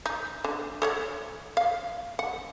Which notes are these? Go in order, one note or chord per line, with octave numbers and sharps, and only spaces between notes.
D#4
D3
A4 C#5 F#5
F5
F#5